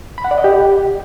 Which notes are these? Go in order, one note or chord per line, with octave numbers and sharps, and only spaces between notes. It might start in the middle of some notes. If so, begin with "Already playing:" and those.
B5
F#5
D5
D#5
G4